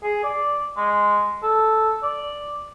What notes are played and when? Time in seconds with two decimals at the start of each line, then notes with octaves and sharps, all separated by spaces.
0.03 G#4
0.24 D5
0.77 G#3
1.43 A4
2.03 D5